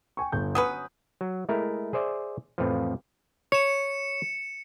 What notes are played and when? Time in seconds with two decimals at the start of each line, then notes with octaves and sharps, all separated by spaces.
0.17 G5 G#5 C#6
0.32 G1 G6
0.55 F#3 C#4 B4 D#6
1.21 F#3
1.49 G#3 A3 E4 A#4
1.93 G#4 C5 D5 E5
2.58 F2 A2 E3 F3
3.52 C#5 C#7 E7